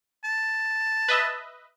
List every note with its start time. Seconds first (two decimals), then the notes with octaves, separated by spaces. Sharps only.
0.24 A5
1.08 B4 D#5 E5